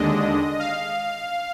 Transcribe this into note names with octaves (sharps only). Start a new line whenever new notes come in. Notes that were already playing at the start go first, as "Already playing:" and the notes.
Already playing: D#2 D3 G#3 D4 D#5
F5